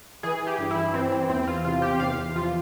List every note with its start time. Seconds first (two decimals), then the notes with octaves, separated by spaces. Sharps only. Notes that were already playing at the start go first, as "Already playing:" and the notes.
0.23 E3 G#4
0.47 G4
0.58 G2
0.71 E4
0.94 E3 C4
1.12 C4
1.29 E2 C4
1.47 F4
1.65 C3 F4
1.82 G4
2.00 E2 F5
2.35 F3 F4